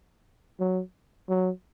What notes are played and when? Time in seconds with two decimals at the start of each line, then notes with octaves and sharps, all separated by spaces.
0.60 F#3
1.29 F#3